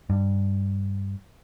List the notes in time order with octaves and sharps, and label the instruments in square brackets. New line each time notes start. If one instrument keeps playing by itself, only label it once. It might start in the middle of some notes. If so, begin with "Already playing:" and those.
[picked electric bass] G2